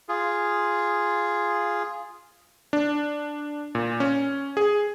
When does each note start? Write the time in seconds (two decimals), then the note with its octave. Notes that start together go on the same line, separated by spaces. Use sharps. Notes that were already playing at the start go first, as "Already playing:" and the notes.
0.09 F4 G#4
2.73 D4
3.75 A#2
4.00 C#4
4.57 G#4